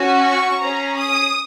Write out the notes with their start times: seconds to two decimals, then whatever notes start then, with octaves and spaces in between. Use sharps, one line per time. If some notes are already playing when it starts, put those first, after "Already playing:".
Already playing: C#4 F#4
0.26 C#6
0.61 C#4 G#4 A#5
0.98 D#6